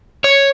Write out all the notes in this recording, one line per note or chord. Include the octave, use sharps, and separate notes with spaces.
C#5